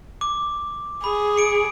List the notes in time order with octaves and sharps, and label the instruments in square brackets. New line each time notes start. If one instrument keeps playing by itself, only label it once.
[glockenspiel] D6
[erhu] G#4 [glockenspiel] B5
[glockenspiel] C#7 D7